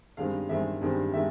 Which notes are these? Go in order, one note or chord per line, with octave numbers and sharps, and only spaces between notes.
G2 D#3 G#3 C4 F5
G2 D#3 G#3 C4 E5
G2 D#3 G#3 C4
D#3 G#3 E5